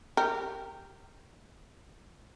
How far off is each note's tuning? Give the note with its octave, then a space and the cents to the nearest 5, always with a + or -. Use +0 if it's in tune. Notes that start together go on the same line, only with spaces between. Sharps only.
G4 +0 A#4 -20